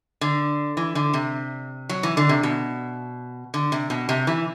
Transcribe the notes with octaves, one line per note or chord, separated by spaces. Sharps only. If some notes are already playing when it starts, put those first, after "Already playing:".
D3
E3
D3
C3
F#3
E3
D3
C3
B2
D3
C3
B2
C3
E3